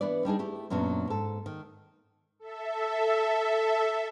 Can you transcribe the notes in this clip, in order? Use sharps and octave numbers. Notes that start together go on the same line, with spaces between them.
E3 B3 D4 B4 D5
G3 D4 D#4 G#4
A3 E4 G4
F#2 A#2 F#3 B3 D4
G#2 A4
D#3
A4 E5